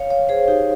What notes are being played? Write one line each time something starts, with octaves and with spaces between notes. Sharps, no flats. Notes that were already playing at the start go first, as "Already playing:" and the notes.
Already playing: C#5 F5
C#5 F5
G#4 C5
D#4 G4